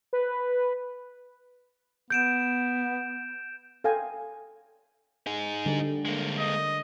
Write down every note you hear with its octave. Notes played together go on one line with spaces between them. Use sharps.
B4
B3 G6 D7 E7
A4 F5 G5 G#5
D#4 G#4
D3 G3
G#3 A#3
D#5